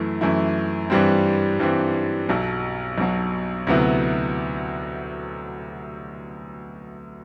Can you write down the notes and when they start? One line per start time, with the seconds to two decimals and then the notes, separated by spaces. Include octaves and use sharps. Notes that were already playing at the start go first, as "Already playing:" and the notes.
Already playing: F#2 E3 A3 E4
0.21 F#2 E3 A3 E4
0.90 G2 E3 G3 C4
1.60 G2 E3 G3 C4
2.29 B1 B2 F#3
2.98 B1 B2 F#3
3.67 D2 C3 F#3 B3 E4